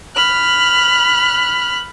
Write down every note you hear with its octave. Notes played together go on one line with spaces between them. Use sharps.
B5 F6 F#6